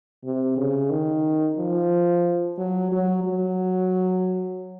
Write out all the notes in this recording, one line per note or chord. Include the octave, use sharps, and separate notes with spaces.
C3
C#3
D#3
F3
F#3
F#3
F#3